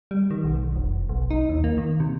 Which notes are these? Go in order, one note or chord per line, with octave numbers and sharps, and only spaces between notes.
G3
D#3
B1
F1
B1
D#4
D#2
A#3
D#3
C3